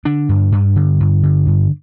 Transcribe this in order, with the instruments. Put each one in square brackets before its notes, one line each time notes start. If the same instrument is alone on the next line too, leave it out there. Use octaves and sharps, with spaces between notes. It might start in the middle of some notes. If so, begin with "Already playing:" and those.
[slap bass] D3 D4
G2
G2
D3
G2
D3
G2